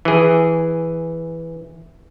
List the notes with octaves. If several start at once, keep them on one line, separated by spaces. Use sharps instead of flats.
E3 G#4